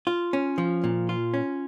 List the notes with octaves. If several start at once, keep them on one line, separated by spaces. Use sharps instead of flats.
F4
C#4
F3
A#2
F4
C#4